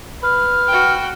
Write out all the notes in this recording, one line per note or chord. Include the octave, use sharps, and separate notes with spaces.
B4 F6
F#4 G5